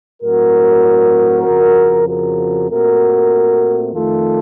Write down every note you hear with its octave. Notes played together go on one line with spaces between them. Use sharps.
A2 F#3 C4 F#4 A#4
F2 C#3 F3
F#4 A#4
A#2 A3 C4 F#4 A#4
F2 D#3 A3 F4 A4